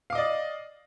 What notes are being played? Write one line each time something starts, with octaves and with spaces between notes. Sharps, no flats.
D5 D#5 F5 D6